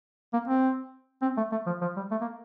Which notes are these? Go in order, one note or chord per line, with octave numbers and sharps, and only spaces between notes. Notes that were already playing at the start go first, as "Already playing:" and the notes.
A#3
C4
C4
A3
A3
F3
F3
G3
A3
A#3